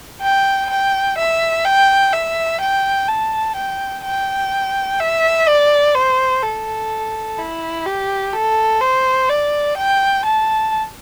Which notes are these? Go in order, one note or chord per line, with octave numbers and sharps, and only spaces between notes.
G5
G5
E5
G5
E5
G5
A5
G5
G5
E5
D5
C5
A4
E4
G4
A4
C5
D5
G5
A5